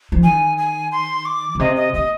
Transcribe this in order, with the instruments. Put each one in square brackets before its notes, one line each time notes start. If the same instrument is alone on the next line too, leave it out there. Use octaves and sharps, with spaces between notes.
[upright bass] F3
[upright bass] D#3 [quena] G#5
[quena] G#5
C6
D6
[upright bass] A#2
[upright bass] C3 [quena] D#5
[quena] D#5
[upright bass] A#2 [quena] D#5